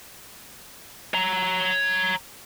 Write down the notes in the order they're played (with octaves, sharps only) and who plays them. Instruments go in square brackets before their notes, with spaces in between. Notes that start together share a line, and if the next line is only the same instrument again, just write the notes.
[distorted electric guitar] C#5 A#5